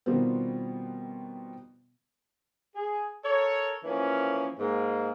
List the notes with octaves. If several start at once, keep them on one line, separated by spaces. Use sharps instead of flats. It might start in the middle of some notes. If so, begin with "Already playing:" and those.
B2 D#3 F3 G3 B3 C4
G#4
A4 A#4 C#5
E3 F3 A#3 C#4
G#2 G#3 A#3